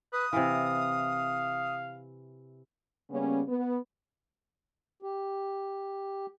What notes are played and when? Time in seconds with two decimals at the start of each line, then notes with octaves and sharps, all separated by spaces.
0.12 B4 D#6
0.33 C3 E3 F5
3.11 C#3 G3 A#3 B3 C#4
3.48 B3
5.02 G4